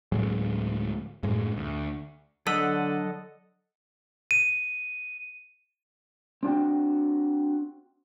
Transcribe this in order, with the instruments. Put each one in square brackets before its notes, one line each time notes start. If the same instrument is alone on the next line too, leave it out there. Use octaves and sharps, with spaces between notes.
[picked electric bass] D1 A2 F#3 G#3
F#2 A2 G#3
D2
[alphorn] D3 [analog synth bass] F#3 [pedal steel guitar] A4 D#5 F#5 [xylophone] E6 B6
[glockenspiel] D#7
[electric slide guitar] C4 D4 F#4 G5